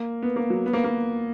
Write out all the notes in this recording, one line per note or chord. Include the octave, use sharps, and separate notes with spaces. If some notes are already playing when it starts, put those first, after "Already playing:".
Already playing: A#3
B3
A#3
F#3
B3
A#3
A#3